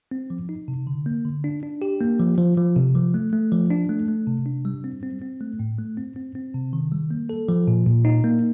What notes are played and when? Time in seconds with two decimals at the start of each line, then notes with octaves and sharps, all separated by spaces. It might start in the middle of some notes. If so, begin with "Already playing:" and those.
0.11 C4
0.30 F3
0.49 D#4
0.68 C3
0.87 D3
1.06 A#3
1.25 D3
1.44 D4
1.63 D4
1.82 G4
2.01 A#3
2.19 F3
2.38 F3
2.57 F3
2.76 C3
2.95 F3
3.14 A3
3.33 A3
3.52 F3
3.70 D4
3.89 A3
4.08 A3
4.27 C3
4.46 D4
4.65 G3
4.84 C4
5.03 C4
5.22 C4
5.41 A3
5.59 A2
5.79 A3
5.97 C4
6.16 C4
6.35 C4
6.54 C3
6.73 D#3
6.92 G3
7.11 A#3
7.29 A4
7.49 F3
7.68 A#2
7.87 A#2
8.05 D#4
8.24 A#3